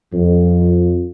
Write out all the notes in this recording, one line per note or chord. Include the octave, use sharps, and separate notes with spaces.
F2